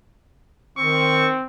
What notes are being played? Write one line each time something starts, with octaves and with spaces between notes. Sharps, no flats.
D#3 C4 C#6